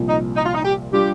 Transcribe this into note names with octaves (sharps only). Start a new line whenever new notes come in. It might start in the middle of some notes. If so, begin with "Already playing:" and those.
Already playing: C2 A#2 F3
D#4
D#4
F4
D#4
G4
G3 D4 F4 G4